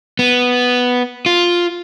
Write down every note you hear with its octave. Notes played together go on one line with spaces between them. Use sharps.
B3
F4